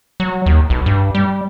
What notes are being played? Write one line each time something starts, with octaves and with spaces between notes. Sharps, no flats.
F#3
D#2
B1
G2
G3